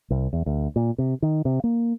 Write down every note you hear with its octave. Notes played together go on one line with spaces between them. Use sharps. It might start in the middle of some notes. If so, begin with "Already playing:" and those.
C2
E2
D2
A#2
C3
D#3
C3
A#3